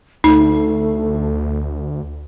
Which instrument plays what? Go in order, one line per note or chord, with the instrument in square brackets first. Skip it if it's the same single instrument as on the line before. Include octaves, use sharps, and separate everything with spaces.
[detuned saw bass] D2 [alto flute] A3 [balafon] D#4